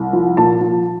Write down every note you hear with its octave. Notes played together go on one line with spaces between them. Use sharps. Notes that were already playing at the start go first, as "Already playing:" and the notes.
Already playing: C2
F3
A#2 A5
F3